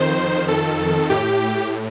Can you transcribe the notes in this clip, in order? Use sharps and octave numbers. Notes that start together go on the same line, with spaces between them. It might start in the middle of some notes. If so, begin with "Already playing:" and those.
Already playing: F2 D#3 C5
A4
A2 G4